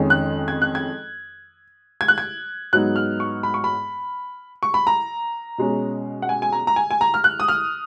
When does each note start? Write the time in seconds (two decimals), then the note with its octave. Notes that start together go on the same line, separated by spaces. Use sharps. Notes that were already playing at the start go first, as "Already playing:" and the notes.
Already playing: F2 D#3 G#3 C#4
0.10 F#6
0.48 G#6
0.62 F#6
0.75 G#6
2.01 G#6
2.08 F#6
2.18 G#6
2.73 G#2 F#3 B3 D#4 F#6
2.96 F6
3.20 C#6
3.43 B5
3.54 C#6
3.64 B5
4.63 C#6
4.74 B5
4.87 A#5
5.58 B2 G#3 C#4
6.22 F#5
6.29 G#5
6.42 G#5
6.52 A#5
6.67 A#5
6.76 G#5
6.91 G#5
7.01 A#5
7.14 F6
7.24 F#6
7.40 D#6
7.48 F6